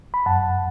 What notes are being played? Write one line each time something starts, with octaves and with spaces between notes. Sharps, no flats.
B5
F#2 F#5 A5